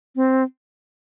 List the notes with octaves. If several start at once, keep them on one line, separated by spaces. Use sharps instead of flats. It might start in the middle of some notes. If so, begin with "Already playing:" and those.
C4